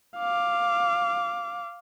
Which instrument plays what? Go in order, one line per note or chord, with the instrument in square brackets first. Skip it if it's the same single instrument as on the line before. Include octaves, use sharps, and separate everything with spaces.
[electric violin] F5 D6